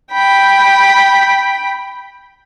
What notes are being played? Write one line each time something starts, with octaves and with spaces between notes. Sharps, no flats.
G5 B5